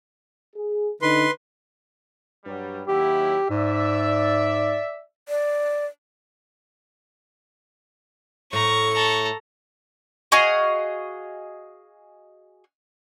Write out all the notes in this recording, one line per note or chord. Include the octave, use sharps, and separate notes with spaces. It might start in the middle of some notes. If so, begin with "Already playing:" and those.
G#4
D3 D#4 B4 C6
G2 F#3 G3
D#2 F#3 E4 G4
G#2 D5 E5
D5
A2 A#5 C#6
A4 A#5
F#4 G#4 D#5 F5